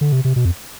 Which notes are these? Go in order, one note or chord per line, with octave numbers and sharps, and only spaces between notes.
D3
C3
C3
B2
F2